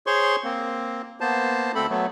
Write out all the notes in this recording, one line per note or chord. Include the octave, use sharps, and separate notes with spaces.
G#4 C5 C#5 C6 C#6
A#3 C4
A#3 B3 C5 A5
D2 A3 C4 A4 B5
F#3 A3 B3